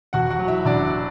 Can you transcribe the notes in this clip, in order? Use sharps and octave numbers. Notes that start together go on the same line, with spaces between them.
E1 F#4 F#5
F#4 F#5
F#3
E4 E5
E1 D4 D5